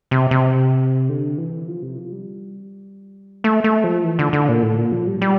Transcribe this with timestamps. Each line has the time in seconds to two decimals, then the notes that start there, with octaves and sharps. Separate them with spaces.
0.11 C3
0.31 C3
1.09 D3
1.38 E3
1.67 F3
1.83 C3
1.98 F3
2.12 G3
3.44 A3
3.64 A3
3.84 F3
4.04 E3
4.19 D3
4.33 D3
4.49 A#2
4.63 A2
4.78 A#2
4.92 F3
5.07 G3
5.21 G3